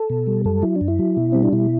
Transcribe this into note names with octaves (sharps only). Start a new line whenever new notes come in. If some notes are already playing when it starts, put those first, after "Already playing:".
Already playing: A4
B2
G3
F#2 A4
F#3 E4
D4
F#2
E4
F#3
B2
G3 C4
D4
B2 E4